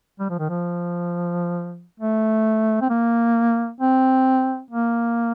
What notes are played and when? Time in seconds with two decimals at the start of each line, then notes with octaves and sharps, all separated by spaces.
0.20 G3
0.30 F3
0.39 D#3
0.49 F3
2.00 A3
2.82 C4
2.90 A#3
3.80 C4
4.71 A#3